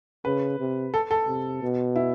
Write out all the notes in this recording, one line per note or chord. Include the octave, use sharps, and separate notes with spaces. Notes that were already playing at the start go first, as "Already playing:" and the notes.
C#3 B4
C3
A4
A4
C3
B2
E4